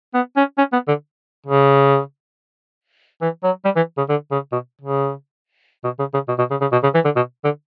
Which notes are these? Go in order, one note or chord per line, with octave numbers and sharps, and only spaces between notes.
B3
C#4
C#4
B3
D3
C#3
E3
F#3
G3
E3
C#3
D3
C#3
B2
C#3
B2
C#3
C#3
B2
B2
C#3
C#3
B2
C#3
E3
D3
B2
D3